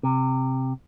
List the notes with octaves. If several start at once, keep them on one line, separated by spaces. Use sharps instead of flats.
C3